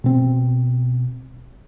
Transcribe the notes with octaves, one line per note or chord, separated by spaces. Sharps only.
B2 C4